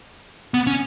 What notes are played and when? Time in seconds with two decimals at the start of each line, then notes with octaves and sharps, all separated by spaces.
0.54 B3
0.67 C#4